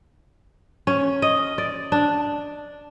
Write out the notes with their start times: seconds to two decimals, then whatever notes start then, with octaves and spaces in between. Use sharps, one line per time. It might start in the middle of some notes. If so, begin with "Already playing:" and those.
0.87 C#4
1.22 D#5
1.58 D5
1.92 D4